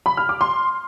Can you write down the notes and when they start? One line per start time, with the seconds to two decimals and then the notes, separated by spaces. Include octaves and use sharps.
0.06 B5
0.17 F6
0.29 D6
0.41 C6